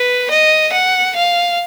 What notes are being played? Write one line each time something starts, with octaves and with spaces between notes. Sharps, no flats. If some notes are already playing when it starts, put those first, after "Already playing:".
Already playing: B4
D#5
F#5
F5